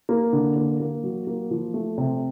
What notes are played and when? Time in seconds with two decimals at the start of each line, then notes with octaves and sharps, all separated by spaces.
0.09 A#3
0.33 D3
0.56 A#3
0.80 A#3
1.03 F#3
1.27 A#3
1.51 F3
1.74 A3
1.98 C3